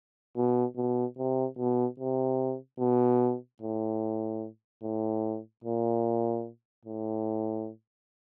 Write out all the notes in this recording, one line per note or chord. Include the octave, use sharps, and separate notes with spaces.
B2
B2
C3
B2
C3
B2
A2
A2
A#2
A2